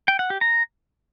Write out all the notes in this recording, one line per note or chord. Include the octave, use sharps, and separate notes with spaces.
G5
F#5
G4
A#5